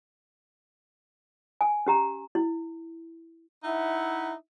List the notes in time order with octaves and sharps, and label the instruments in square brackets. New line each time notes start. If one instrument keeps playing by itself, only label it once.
[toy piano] G#5
C#4 G4 A#5
E4
[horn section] D#4 E4 E5 F#5